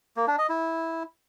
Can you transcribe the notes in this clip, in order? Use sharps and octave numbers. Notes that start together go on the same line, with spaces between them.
A#3
D4
D#5
E4